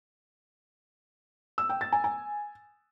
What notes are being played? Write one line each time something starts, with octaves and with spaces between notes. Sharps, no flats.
E6
G5
A6
G#5
G#5